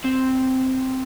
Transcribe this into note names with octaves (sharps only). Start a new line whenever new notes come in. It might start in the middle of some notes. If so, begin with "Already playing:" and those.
C4